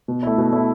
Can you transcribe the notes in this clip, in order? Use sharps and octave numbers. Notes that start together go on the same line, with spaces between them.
B2
A3 E4
B2
A3 E4